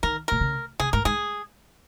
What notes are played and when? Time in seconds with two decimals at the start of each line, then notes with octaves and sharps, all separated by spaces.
0.03 D#3 A#4
0.28 A#2 A#4
0.41 C#3
0.80 C#3 G#4
0.93 G#2 A#4
1.05 G#2 G#4